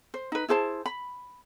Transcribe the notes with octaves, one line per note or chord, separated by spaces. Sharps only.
C5
D#4 B4
E4 G#4 C5 A5
B5